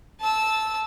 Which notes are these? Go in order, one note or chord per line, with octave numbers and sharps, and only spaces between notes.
A5 E6